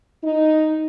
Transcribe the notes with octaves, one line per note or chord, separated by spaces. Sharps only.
D#4